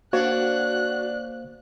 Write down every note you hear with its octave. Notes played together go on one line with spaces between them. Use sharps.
A#3 D4 F#4 C5 C#5 F5 F#6